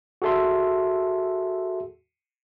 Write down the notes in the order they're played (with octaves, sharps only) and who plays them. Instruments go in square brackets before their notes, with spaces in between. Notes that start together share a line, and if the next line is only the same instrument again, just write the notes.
[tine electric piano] F#4 G#4 A4 E5 C6